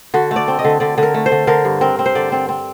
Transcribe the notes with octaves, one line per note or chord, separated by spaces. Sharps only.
D3 F#4
A3
D5
C4
D#5
D3
D3 D5
D3
A#4
A3
C5
D3
D3 A#4
G2
C4 A#4
C4
C5
D3 D5
C4
C4